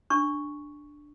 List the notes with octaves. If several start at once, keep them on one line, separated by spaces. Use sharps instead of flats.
D4 C#6